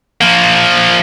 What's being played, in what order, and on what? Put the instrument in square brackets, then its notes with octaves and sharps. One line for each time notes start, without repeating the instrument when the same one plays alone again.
[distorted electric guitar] F3 A#3